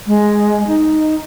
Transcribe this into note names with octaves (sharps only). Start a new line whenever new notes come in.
G#3
D#4